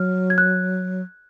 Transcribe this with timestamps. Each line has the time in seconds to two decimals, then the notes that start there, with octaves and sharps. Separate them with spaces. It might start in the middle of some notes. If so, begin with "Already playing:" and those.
Already playing: F#3 F6
0.30 G#6
0.38 F#6